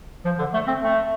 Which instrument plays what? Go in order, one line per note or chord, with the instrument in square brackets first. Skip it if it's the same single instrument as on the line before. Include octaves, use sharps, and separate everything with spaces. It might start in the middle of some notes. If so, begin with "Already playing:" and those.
[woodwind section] F3
D3
A3
C4
A3